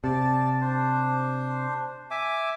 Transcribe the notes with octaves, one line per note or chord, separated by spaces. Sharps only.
C3 D5 A5
D4 C5
E5 G#5 D6